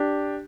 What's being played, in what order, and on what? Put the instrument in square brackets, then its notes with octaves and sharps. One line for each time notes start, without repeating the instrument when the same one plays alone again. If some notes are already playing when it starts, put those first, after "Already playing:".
Already playing: [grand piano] D4 G4